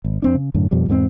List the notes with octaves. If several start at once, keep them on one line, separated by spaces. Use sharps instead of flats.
G#1
F2 C4 D4
C#3
F#2 A2 D3
F2 B2 F3 G3
E2 G#2 A#3 C4